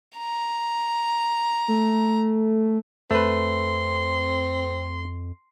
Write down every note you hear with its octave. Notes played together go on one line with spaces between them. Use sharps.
A#5
A3
F2 A3 C4 B4 C6